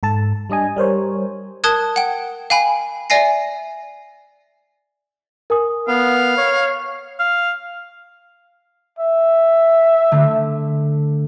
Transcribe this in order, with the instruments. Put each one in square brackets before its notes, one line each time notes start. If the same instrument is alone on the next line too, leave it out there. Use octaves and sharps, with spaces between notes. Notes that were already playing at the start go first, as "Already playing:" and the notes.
[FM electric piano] G#2 A4 A5
G3 D4 D#5 G#5
G3 A#4 C5 C#5
[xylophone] A#4 A5 D#6 F#6 G#6
F#5 G5
F5 G5 G#5 B5
D5 E5 G#5 A#6 C7
[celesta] A#4 G#5 D#6
[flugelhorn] B3 [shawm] F5
[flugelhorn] C#5
[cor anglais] F5
[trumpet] E5
[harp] D3 A3